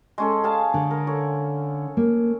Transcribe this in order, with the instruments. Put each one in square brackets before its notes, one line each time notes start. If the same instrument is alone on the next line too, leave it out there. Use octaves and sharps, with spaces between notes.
[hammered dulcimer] G#3 C#4 A4
G#4 F5 A5
[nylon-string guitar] D3
[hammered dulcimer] A#4
A4 C#5
[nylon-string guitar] A#3